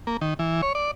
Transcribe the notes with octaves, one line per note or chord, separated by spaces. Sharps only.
A#3
D#3
E3
C#5
D5